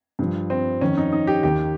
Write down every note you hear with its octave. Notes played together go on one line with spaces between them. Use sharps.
G2 F3
C4
F2 D#3 C#4
D#4
D#4
G4
D#2 D#3 G4